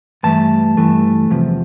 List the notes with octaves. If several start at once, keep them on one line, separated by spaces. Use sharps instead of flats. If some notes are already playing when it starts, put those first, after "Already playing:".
G2 E3 A3 A5
G2 E3 A3
E2 C3 F3